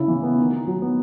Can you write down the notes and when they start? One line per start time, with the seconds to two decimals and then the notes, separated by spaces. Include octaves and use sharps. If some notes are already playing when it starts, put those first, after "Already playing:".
Already playing: C#3 E4
0.08 E3
0.23 B3
0.38 D#3
0.52 D#4
0.67 F#3
0.82 B3